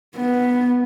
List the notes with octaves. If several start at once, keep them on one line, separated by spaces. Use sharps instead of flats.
B3